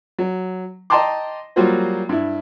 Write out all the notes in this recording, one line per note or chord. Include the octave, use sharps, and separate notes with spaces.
F#3
D#5 G5 A5 A#5 C6 D6
F#3 G3 A#3 F4 F#4 C5
G2 E4